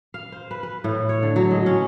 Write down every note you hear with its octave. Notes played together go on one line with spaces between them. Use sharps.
F5
C5
B4
B4
A2
C#5
D3
F#3
G#3
C#4